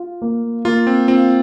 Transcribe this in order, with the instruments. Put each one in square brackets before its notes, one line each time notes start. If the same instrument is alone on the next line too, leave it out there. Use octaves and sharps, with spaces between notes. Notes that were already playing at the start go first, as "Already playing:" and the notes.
Already playing: [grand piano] F4
A#3
[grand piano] A#3 [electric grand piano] F4
[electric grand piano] C4
[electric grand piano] C4 [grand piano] F4